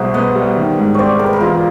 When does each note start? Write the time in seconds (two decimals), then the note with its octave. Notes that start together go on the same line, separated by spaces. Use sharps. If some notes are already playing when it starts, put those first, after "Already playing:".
Already playing: C2 B2 G#4 C5
0.14 B3 D#5
0.36 G3
0.57 D#3
0.78 G#2
0.94 C4 C#5 D5
1.19 G#3 A#4
1.26 B4
1.33 A#4
1.41 E2 F4